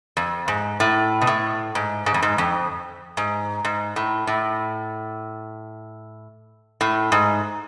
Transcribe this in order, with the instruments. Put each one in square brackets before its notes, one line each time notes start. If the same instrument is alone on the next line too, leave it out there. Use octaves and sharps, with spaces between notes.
[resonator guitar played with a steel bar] F2
G#2
A2
B2
A2
G#2
G#2
F2
G#2
F2
G#2
G#2
A2
A2
A2
G#2